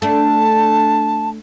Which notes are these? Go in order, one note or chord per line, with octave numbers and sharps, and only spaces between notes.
A3 D4 A5